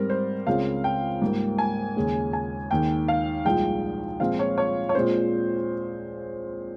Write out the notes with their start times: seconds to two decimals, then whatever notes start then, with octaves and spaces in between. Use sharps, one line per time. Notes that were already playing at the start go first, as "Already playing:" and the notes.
Already playing: G#2 G3 C4 A#4
0.10 C5
0.47 C#2 C#3 G#3 C4 F5
0.84 G5
1.22 G#2 G3 A#3
1.58 G#5
1.96 D#2 C#3 G#3
2.33 G#5
2.71 D#2 D#3 G#3 G5
3.08 F5
3.45 C2 A#2 F3 G#3 G5
4.20 A#2 F3 G#3 C4 F5
4.39 C#5
4.58 C#5
4.89 C#5
4.95 A#2 G#3 C4 C5